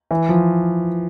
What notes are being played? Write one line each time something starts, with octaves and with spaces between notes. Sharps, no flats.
E3
F3